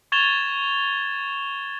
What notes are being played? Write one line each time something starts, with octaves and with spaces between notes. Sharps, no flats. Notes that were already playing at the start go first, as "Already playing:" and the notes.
C#6 G#6 A6 E7 F7 G7